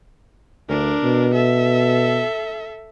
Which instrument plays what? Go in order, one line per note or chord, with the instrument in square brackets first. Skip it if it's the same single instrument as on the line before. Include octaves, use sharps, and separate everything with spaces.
[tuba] D2 [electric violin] D4 A#4
[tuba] B2
[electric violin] A4 E5